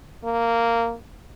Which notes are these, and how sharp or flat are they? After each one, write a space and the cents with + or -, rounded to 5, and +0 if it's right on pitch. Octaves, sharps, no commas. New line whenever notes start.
A#3 -10